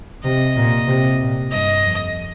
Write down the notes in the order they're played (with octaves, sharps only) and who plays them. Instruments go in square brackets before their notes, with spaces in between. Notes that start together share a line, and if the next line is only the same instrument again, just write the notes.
[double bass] C3 [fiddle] D#5
[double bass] A#2
C3
A#2
[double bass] G2 [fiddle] D#5
[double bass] F2